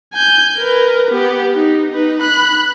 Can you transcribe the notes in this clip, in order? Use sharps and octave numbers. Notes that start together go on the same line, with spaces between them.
G#5 G6
A#4 B4
B3 G4
D#4
D#4 B4
B5 F#6